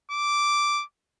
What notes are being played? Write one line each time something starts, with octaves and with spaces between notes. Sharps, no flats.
D6